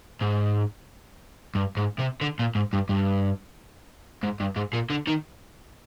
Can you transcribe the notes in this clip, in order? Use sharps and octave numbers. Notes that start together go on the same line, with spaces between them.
G#2
G2
G#2
C3
D3
A#2
G#2
G2
G2
G#2
G2
G#2
A#2
D3
D#3